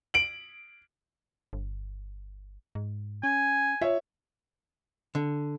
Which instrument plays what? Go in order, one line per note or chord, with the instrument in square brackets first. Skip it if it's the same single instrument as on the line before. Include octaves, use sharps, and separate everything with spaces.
[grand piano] D7 F#7
[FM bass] G1
G#2
[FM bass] C#4 [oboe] G#5
[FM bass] F4 [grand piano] C#5 E5
[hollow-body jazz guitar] D3